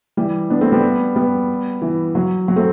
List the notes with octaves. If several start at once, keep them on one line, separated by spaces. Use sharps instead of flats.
E3 G3
B3 D4
A3 C4
G3 B3
G3 B3
E3
F#3
F#3
A3 C4